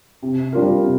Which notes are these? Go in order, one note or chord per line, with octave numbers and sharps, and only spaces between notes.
C3
G3 D4 F4 A#4
C3